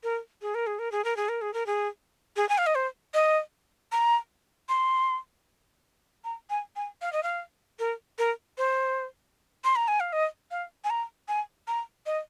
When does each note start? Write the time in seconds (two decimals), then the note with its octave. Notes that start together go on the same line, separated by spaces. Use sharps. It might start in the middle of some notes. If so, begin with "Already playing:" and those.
0.03 A#4
0.42 G#4
0.55 A#4
0.67 G#4
0.79 A#4
0.92 G#4
1.04 A#4
1.16 G#4
1.29 A#4
1.41 G#4
1.54 A#4
1.66 G#4
2.36 G#4
2.49 G#5
2.58 F5
2.66 D#5
2.75 C5
3.14 D#5
3.92 A#5
4.69 C6
6.24 A#5
6.50 G#5
6.76 G#5
7.02 F5
7.13 D#5
7.23 F5
7.79 A#4
8.18 A#4
8.58 C5
9.64 C6
9.76 A#5
9.88 G#5
10.00 F5
10.13 D#5
10.51 F5
10.84 G#5
10.90 A#5
11.28 G#5
11.67 A#5
12.06 D#5